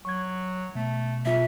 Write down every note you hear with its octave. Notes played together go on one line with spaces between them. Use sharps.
F#3 C#6 G#6
B2 A3
B2 G3 F4 E5